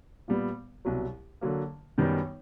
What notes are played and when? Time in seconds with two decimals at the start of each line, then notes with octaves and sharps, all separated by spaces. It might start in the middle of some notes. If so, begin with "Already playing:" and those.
0.28 A#2 G3 B3
0.85 C2 B2 F#3
1.41 D3 F#3 A#3
1.98 F#2 D#3 G3 B3 D#4